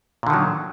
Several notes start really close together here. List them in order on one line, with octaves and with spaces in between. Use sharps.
A#2 D3 D#3 F#3